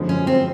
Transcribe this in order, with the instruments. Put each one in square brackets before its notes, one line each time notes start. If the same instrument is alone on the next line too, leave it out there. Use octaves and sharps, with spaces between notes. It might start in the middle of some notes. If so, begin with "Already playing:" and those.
Already playing: [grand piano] F#2 D3 F3 G#3 B3
[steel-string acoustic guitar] C#4
C4